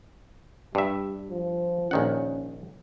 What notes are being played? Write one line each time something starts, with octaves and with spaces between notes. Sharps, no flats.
G2 G3 E5
F3
A#1 D#3 C#4 F#5